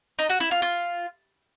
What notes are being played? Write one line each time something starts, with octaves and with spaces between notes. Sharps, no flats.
D#4
F#4
E4
F4
F4